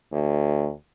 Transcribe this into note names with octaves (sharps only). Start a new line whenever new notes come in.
D2